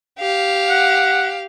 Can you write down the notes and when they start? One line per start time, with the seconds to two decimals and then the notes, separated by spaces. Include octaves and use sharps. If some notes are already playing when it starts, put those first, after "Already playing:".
0.20 G4 F5
0.69 F#5